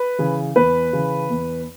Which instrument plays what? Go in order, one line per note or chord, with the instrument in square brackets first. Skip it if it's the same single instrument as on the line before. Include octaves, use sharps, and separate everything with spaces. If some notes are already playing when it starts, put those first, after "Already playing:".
Already playing: [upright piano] B4
[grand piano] C#3 E3
[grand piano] E2 [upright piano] B4
[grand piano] C#3 E3
E2